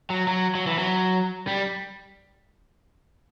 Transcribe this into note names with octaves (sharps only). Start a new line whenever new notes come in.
F#3
F#3
F#3
E3
F#3
G3